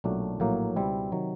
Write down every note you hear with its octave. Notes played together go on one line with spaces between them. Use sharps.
B1 A#2 F#3 A3 D4
A#1 A2 F#3 A#3
C#2 B2 G3 C4 E4
C3 D#3 F#3